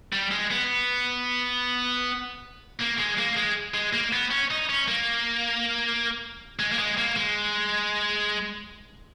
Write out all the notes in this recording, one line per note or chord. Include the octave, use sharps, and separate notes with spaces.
G3
G#3
B3
A#3
G#3
A#3
G#3
G#3
A#3
B3
C#4
D#4
C#4
A#3
G#3
A#3
G#3
A#3
G#3